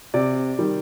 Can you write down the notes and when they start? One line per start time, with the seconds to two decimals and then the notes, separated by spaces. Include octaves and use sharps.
0.14 C3 D5
0.59 D#3 G3